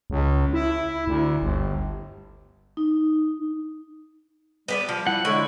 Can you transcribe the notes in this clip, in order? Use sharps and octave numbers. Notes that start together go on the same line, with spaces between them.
C#2
E4
D2
G1
D#4
G3 B3 B4 D5
F3
E4 F#5
D3 G#3 E4 C#5